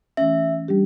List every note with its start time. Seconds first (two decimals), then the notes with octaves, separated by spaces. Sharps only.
0.17 E3 A3 C#4 E5
0.68 G3 D4 G4